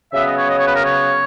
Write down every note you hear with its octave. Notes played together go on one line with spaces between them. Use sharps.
C#3 F#3 B3 E5
D#5
C#5
D#5
C#5
B4
A#4
C#5